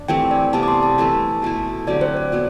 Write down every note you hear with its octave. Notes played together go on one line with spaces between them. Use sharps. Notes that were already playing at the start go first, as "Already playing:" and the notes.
Already playing: D4
E3 A3 C4 G4 G5
D5
C3 G3 B3 A5
D6
C6
A5
E3 A3 E4 B4
B2 A3 E4
D3 F#3 C4 G4 D5
C5
D5
B2 F#3 B3